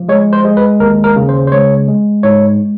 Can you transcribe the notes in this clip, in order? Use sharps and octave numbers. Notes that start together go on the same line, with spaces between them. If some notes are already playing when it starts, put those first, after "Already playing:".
Already playing: F3
G#3 C#5
C5
G#3
B4
D#2 A#4
A#4
C#3
C5
C5
G#3 C#5
G#3
G#2 C#5